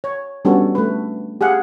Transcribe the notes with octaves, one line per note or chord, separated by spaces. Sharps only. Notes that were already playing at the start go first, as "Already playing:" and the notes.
C#5
G3 B3 C#4 D4 F#4 A4
A3 B4
G4 G#4 F5 F#5